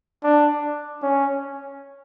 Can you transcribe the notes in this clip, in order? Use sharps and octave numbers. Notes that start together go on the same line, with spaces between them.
D4
C#4